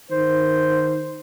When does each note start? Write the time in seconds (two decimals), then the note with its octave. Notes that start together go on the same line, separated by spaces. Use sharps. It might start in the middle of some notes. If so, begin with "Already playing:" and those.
0.11 D#3 C5